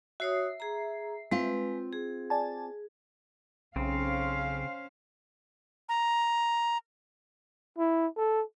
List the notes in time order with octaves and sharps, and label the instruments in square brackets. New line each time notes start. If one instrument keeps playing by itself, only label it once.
[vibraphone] F#4 C#5 D#6 [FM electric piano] E5 C7
[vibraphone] G#4 A#5
[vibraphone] G#3 B4 [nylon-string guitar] C4 F4
[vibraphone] G#4
[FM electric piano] D5 G#5 A5
[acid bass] B1 [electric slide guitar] C#3 C4 [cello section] C#4 C5 F5
[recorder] A#5
[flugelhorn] E4
A4